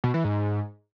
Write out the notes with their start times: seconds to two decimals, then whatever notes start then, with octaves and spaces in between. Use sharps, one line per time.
0.04 B2
0.14 E3
0.24 G#2